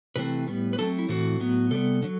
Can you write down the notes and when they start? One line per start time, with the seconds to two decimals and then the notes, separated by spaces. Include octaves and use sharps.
0.16 C3 E3 A3 C4 B4
0.47 A2 G3 B3
0.73 B4
0.78 D3 F#3 A3 C4 A4
0.99 E4
1.09 A2 E3 A3 C4 F#4
1.40 A2 F#3 B3
1.71 C3 G3 B3 A4
2.02 D3 F#3